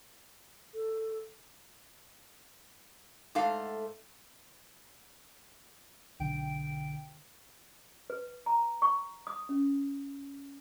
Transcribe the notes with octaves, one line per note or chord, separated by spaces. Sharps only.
A4
G#2 A3 A4 F5
B1 D3 G5 D7
B4
A#5
C#6
D#6
C#4